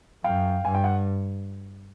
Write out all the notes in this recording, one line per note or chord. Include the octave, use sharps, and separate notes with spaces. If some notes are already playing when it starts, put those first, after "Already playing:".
F#2 F5 G5
G2 G#5
G5
F#5